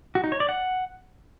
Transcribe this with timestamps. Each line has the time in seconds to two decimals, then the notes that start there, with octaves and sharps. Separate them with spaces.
0.15 F#4
0.24 D#4
0.32 C#5
0.40 D5
0.49 F#5